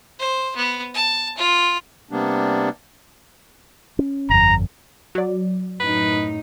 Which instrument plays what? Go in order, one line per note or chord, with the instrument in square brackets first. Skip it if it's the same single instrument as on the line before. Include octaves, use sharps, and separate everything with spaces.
[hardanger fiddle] C5
B3
A5
F4
[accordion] C3 G3 A#3 B3 D4
[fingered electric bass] C#4
[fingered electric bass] G1 F2 [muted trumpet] A#5
[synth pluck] F#3 D5
[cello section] F#2 A2 D#4 [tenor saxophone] B4